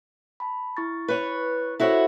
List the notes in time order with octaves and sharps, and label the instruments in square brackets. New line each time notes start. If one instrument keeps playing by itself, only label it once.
[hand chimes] A5 B5
E4 C#6 A6
[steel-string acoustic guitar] B4 C#5
[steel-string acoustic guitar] E4 F#4 C#5 [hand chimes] A4 C5